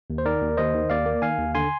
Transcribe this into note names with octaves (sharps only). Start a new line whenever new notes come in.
D#2
C5
D#3 A#4 D5
D#2
D#2 C5 D#5
D#3
D#2 D5 F5
A#3
D#3 F5 G#5
D#2
D3 G#5 C6